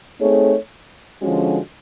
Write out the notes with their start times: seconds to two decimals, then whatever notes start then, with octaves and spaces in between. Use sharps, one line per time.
0.19 A3 C4 D#4 G#4 C#5
1.21 D3 F3 G#3 C#4 F#4